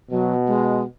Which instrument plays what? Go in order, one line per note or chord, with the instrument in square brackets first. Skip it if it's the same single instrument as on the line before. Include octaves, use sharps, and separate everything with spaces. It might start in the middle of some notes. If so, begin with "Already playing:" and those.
[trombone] B2 [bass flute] F#3
[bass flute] G#3